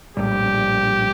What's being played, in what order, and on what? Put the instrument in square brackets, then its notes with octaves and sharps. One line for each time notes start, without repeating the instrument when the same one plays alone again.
[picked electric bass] A#1 A2 G3 [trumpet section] G4